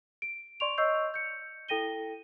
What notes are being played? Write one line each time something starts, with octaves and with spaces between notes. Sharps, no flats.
D7
D5 C6 C#6 D7 F7
C#5 D#5 C#6 E6 G6 C7
G6 C#7
E4 A4 G5 A#6 D#7 G7